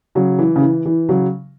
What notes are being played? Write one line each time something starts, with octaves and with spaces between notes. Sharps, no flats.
C#3 F#3
E3
C#3
E3
E3
C#3 F#3